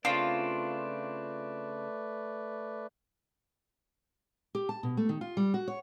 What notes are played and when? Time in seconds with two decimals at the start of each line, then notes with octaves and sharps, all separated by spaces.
0.05 C#3 A3 C4 D4 F4 B4 D5
4.55 G4
4.69 A5
4.83 B2
4.97 A3
5.09 D#3
5.21 F4
5.37 G3
5.54 F#4
5.68 C#5